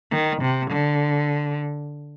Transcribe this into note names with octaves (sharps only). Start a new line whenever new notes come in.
D#3
C3
D3